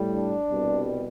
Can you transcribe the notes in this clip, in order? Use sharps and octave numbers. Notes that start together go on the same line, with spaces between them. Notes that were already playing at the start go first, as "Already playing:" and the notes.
Already playing: A2 G3
D4
C2 B2 G3